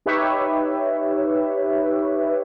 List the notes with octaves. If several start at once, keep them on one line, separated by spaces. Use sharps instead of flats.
D#4 G4 B4 C#5 E5